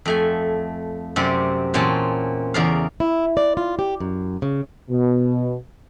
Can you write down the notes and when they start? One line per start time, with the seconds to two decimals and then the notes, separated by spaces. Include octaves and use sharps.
0.05 F2 A3 G#5
1.16 F#2 C3 C4 D5 F#5
1.74 E2 A#2 C4 C#4 A5
2.54 E2 C#3 A#4 D5 F5
3.00 E4
3.37 D5
3.57 F4
3.79 G4
4.00 F#2
4.42 C#3
4.90 B2